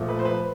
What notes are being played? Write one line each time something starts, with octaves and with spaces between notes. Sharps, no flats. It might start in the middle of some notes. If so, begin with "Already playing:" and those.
Already playing: A#2 F3 A3
B4
C5
B4